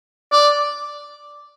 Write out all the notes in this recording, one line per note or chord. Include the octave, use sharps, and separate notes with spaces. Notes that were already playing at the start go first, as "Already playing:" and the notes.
D5